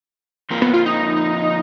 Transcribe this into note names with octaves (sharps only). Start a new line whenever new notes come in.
F2 F3 A#3
B3
F4
D#4